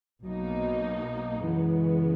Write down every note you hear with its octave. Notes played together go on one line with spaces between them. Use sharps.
B1 B2 F#3 A#3 D#4
F#2 C#3 E3 G#3 B3